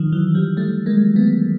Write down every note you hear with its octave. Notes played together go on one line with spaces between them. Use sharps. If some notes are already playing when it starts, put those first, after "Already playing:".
Already playing: D#3 F3
E3 F#3
F3 G3
G3 A3
G#3 A#3
A3 B3